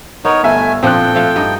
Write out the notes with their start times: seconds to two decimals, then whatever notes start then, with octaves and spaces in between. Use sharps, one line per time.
0.25 B3 D#4 A#4 C#5
0.44 G1 A3 E5 G#5
0.83 A#2 F3 C4 D4 A4 G5 F#6
1.15 F3 A3 F5
1.36 G2 D#4 D#5